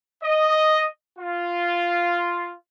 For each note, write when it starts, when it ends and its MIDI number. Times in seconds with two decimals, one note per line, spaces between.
0.23 0.86 75
1.18 2.53 65